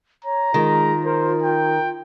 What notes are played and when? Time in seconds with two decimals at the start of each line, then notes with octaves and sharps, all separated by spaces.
0.24 C#5 A#5
0.54 D#3 G#3 F4
1.05 A#4 C5
1.42 G5